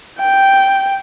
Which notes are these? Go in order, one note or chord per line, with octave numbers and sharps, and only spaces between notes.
G5